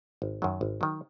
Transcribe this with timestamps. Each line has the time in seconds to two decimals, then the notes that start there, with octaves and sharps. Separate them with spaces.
0.22 G#1
0.42 F#2 D#3 F#3
0.61 G#1
0.81 D#3 F#3